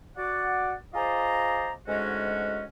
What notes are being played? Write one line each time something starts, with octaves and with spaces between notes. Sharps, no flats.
F#4 D5 F#5
F4 G#4 C5 D5 D#5 A#5
D2 G#2 G#3 C#4 F#4 D#5